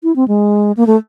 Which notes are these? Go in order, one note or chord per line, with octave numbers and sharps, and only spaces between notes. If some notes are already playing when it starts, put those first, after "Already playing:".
E4
C4
G#3
A#3
A3